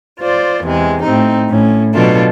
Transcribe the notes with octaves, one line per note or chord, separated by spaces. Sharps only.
F4 C5 D5
E2 C3 G#3
A2 C4 D#4
A2 C#4
B2 F#3 D4 F4 A4